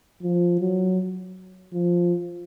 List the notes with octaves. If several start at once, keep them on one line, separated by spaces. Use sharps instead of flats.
F3
F#3
F3